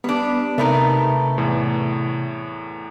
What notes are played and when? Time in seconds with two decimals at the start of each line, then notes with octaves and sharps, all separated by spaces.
0.04 G3 B3 D4
0.58 C3 A3 B3 D#4 A4 A#4
1.38 E2 A2